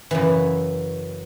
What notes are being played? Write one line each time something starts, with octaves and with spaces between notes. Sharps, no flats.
F#2 C#3 E3